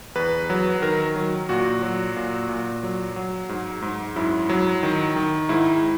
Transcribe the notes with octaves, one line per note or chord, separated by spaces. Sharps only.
E2 B4
F#3
D#3 A#4
F#3
A#2 F#4
F#3
A#2
A#2
F#3
F#3
G#2
G#2
F#2 E4
F#3
D#3
D#3
G#2 E4